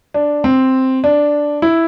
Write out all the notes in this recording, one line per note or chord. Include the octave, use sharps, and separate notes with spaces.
D4
C4
D4
E4